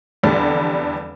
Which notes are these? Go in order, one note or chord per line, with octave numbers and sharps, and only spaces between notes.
F1 E2 D3 G3 A4